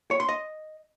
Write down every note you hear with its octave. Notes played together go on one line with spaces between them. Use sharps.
C#5
C6
D#5